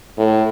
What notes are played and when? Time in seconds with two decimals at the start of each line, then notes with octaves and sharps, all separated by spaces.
0.17 A2